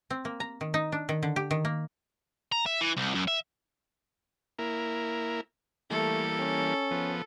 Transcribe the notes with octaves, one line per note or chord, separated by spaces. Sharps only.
C4
A#3
A#5
D#3
D#4
D4
D#3
D3
G4
D#3
A#3
A#5
E5
E3
C2
F#2
E5
A#3 E4 A#4
E3 G3 A3 A#3 A4
C#4
F3 B3